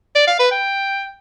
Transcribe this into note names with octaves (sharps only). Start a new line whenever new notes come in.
D5
F5
B4
G5